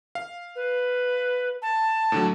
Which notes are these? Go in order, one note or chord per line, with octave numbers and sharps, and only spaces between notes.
F5
B4
A5
A2 D3 F#3